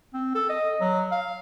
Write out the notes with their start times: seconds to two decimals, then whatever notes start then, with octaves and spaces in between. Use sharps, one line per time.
0.13 C4
0.35 A4
0.49 D#5
0.81 F#3
1.12 F5